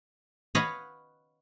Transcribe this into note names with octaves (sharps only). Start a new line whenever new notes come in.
B4 C#5 D#5 F5 F#5